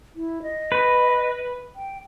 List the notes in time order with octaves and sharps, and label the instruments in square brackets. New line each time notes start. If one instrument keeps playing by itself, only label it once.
[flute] E4
D#5
[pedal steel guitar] B4
[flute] G5